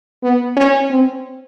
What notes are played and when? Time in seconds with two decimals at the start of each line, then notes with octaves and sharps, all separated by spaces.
0.23 B3
0.57 C#4
0.90 C4